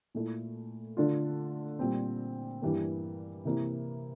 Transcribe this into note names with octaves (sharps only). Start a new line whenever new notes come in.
A#2 A3 E4
D3 A3 D4 F4
A#2 G3 C4
G2 E3 G3 A#3
C3 E3 A#3 E4